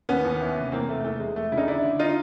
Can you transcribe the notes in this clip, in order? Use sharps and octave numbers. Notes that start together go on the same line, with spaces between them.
D#2 B3 C#4
D#2
E3
F1
E2 A#3 C4
F1 A3
E2 A3
E2 G#3
E2 A3
C#3 E4
C#4 D#4
D3 D4 E4
D3
D#4 F4